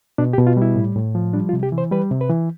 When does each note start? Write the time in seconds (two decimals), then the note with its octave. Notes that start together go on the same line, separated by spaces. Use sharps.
0.18 B2 D4
0.33 G4
0.38 B2
0.47 F4
0.57 G3 E4
0.76 A2
0.96 A2
1.15 F3
1.33 G3 D4
1.49 F4
1.53 C3
1.63 G4
1.72 E3
1.78 C5
1.91 G3 B4
2.11 C3
2.21 B4
2.30 E3